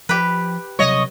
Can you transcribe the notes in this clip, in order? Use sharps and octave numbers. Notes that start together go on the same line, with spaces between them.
F3 G4 B4
C3 F#3 G3 C#5 D#5